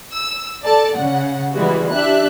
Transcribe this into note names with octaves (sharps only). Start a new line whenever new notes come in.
E6
A4 D5 A5
C#3 F#5
E3 G3 G#3 B3 F#4
D4 G4 E5 F#6